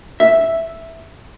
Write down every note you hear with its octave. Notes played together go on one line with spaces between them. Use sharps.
E5